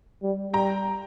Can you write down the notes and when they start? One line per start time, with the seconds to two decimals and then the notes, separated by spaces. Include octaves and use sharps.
0.23 G3
0.53 G3 G5 A#5